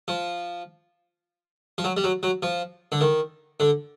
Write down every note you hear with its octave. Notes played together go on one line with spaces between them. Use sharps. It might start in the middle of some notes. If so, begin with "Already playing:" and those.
F3
F3
F#3
G3
F#3
F#3
F3
D3
D#3
D3